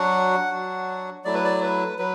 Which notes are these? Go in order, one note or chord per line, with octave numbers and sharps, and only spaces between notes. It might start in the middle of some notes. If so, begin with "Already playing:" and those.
Already playing: F#3 D4 F#4 F#5
F#3 D4 F#4
F#3 A3 E4 D5
B4
D5
B4
F#3 B4